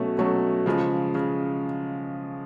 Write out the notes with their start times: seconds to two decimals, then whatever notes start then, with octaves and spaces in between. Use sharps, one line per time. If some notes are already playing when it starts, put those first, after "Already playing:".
Already playing: B2 F#3 A3 C#4
0.18 B2 F#3 A3 C#4
0.66 C#3 F3 G#3
1.15 C#3